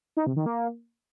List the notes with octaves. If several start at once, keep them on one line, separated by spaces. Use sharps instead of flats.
D#4
C3
D#3
A#3